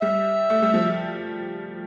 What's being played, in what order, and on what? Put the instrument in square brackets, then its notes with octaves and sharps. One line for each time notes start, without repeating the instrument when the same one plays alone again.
[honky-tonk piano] G3 [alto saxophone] E5
[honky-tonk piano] A3
G3
F3